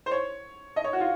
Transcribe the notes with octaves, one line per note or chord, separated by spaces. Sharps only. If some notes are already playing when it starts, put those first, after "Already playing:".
C5
C#5
D#5
C#5
F#4
F4